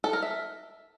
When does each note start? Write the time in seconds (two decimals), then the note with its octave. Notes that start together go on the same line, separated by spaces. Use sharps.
0.04 A4
0.13 A#4
0.23 E5